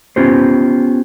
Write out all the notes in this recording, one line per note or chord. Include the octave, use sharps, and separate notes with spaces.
B3 C#4 F4 G4 C5